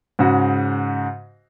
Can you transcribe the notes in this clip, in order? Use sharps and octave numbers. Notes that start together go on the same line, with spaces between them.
G#2 C#3 F#4